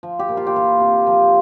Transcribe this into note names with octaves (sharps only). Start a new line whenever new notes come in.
F3
G4
A#2
F4
G4
E3 F4
C3
F3